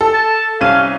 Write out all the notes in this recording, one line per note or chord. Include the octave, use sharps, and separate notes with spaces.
A4
A5
C2 C#4 F5 D#7